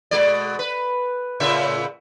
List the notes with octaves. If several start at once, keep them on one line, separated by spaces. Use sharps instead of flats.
B2 G#3 D5
B4
A2 C#3 E5